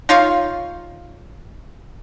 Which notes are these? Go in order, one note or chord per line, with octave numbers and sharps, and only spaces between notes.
D#4 F4 C#5 F5